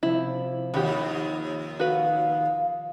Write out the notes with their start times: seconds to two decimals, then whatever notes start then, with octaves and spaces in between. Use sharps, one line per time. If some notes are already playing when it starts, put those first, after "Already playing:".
0.03 C3 F3 E4
0.74 D#2 F#4 G4 B5
1.80 F#4 B4 F5